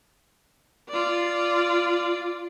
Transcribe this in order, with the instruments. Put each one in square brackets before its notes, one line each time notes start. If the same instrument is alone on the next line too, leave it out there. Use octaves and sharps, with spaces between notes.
[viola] F4 D5